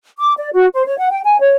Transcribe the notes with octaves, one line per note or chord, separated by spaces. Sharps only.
D6
D5
F#4
C5
C#5
F#5
G5
G#5
C#5